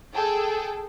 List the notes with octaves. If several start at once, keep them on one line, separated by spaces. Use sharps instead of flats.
G#4 A4 G5 A5